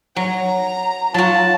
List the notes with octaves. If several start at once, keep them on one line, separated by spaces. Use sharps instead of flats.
F#3 A#5
F#3 F4 F#4 A5